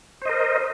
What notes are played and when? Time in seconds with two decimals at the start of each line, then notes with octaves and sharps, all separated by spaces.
0.22 C5
0.25 D#5
0.29 A#4